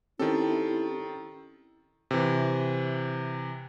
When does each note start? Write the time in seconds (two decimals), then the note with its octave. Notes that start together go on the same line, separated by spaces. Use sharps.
0.19 D#3 C4 C#4 E4 G4 A4
2.11 C3 E3